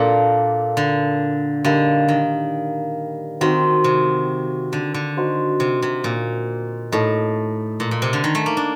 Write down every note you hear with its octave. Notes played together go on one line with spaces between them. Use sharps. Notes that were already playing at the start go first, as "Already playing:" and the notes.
Already playing: A#2 A#3 D4 A4
D3
D3 G3 A#3 D#4
D#3
D#3 C4 F#4 C5
C3
D3
D3
D#4 F#4 C5
C3
C3
A#2
A2 D#4 A4 D#5
A#2
A#2
C3
D3
D#3
A3
A#3
D4